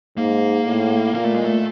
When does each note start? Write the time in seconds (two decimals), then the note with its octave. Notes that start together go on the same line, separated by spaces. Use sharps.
0.17 G#2 A#3
0.66 A2
1.14 A#2 A#3
1.24 A3
1.34 G#3
1.44 A3